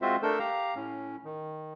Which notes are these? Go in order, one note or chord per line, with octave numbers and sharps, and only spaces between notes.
G#3 C4 F4 F#4 C5 E5
A3 D4 A4 A#4 E6 G6
G4 F5 A#5
A2 C#4
D#3